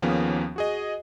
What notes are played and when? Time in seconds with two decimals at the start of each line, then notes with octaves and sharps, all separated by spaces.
0.02 D#2 F3 A#3 B3 C#4 G#4
0.56 F#4 G#4 D#5